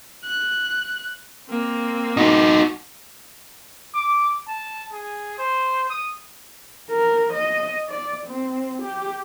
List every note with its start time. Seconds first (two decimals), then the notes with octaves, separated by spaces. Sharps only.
0.24 F#6
1.48 A#3 C4
2.17 D#4 F#4
3.94 D6
4.47 A5
4.93 G#4
5.38 C5
5.90 D#6
6.90 A#4
7.33 D#5
7.89 D5
8.26 C4
8.82 G4